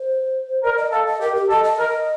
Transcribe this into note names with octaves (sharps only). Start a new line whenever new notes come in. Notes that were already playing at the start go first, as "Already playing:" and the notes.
Already playing: C5
A#4 D5
D#5
A4 F5
D#5
G4 A#4
G4
A4 D#5
D#5
A#4